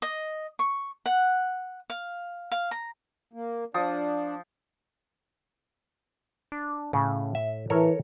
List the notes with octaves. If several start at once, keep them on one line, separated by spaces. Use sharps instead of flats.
D#5
C#6
F#5
F5
F5
A#5
A#3
F3 D4 D#6
D4
A2 C#3
E5
E3 A4 A#4 C#5